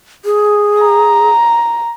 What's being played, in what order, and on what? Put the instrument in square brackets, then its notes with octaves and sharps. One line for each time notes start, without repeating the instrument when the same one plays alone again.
[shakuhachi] G#4
[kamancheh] A#5